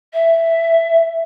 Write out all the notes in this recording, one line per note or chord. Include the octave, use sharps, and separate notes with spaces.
E5